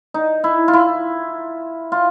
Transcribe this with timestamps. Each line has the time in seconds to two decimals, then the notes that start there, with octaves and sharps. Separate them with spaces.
0.14 D#4
0.44 E4
0.68 F4
0.73 E4
1.92 F4